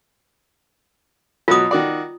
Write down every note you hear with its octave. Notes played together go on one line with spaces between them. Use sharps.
B2 F#3 F4 D#6
D#3 F#4 D5